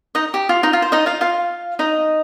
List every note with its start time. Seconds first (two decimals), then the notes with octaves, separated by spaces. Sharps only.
0.15 D#4 D#5
0.34 G4
0.49 F4
0.63 D#4
0.73 F4
0.82 C5
0.92 D#4 D#5
1.06 F4 F5
1.21 F4 F5
1.79 D#4 D#5